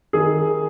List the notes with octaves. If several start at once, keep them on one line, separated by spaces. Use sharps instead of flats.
D#3 G#4